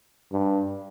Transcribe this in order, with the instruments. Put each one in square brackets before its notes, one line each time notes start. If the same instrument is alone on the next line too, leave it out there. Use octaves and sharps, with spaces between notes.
[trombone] G2